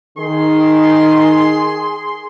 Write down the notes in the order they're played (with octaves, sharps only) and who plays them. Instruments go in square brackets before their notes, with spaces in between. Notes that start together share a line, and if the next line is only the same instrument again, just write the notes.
[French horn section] D#3 [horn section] G#4 C6